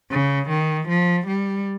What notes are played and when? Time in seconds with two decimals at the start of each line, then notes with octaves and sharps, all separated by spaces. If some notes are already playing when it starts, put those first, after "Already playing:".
0.11 C#3
0.49 D#3
0.88 F3
1.27 G3